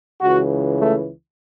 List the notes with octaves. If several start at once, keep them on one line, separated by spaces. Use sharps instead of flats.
C#2 C#3 E3 F#4
A3